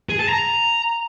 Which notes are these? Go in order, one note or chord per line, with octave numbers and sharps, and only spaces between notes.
G#4
A5
A#5